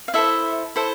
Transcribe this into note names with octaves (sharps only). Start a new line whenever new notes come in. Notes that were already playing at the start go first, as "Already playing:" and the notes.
F5
E4 A4 C5 E5
E4 A4 C5